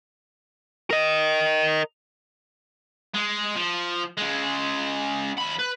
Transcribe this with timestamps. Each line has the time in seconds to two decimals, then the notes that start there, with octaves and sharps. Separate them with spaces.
0.91 A#4 D#5
3.14 G#3
3.57 F3
4.17 C#3 G#3
5.38 D#2 B5
5.59 B4